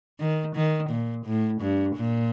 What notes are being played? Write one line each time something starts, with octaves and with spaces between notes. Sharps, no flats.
D#3
D#3
A#2
A2
G2
A#2